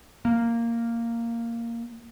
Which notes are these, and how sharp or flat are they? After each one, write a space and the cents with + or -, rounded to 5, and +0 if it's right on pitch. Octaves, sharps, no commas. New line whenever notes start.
A#3 -5